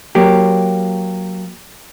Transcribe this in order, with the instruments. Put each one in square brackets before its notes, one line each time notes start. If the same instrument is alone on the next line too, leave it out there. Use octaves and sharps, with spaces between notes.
[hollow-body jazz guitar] F#3 A#3 G4